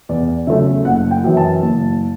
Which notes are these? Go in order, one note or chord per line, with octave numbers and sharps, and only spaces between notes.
E2 D5
C#3 F#3 A3 E5
F#1 F#5
G5
F#2 E3
A5
F#1